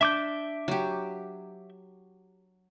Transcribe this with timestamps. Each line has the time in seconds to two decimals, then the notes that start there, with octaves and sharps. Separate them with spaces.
0.01 D4 E5 D6 G6
0.68 F#3 G4